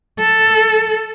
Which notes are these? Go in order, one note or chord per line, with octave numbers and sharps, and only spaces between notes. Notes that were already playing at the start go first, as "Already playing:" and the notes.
A4